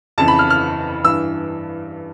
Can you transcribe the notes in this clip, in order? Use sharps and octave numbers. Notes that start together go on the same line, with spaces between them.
F2 C#3 E3 A5
B5
F6
F6
G2 E3 E6